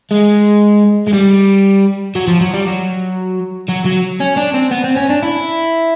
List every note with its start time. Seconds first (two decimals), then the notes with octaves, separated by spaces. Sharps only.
0.11 G#3
1.07 G#3
1.13 G3
2.15 F#3
2.28 F3
2.41 F#3
2.53 G3
2.67 F#3
3.68 F#3
3.85 F#3
4.20 C#4
4.37 D4
4.54 C4
4.71 B3
4.84 C4
4.96 C#4
5.09 D4
5.23 E4